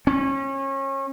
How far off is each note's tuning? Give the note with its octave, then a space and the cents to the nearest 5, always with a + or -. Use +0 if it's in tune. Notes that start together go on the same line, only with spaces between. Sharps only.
C#4 -30